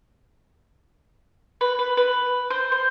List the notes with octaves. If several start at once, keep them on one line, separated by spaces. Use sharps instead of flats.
B4
B4
B4
C5
C5